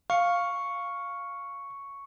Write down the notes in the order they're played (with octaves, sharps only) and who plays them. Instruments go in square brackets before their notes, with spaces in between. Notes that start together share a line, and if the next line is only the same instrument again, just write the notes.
[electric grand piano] F5 [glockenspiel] C#6 C#7